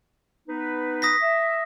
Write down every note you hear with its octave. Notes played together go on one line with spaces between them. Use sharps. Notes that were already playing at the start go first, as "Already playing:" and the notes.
B3 D#4 B4
D#6 A#6 B6
E5